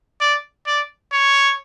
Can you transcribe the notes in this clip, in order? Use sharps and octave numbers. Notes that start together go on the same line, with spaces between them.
D5
D5
C#5